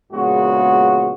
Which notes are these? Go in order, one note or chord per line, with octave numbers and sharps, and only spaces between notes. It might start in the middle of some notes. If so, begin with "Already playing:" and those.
A#1 A#2 C#3 G#3 B3 F#4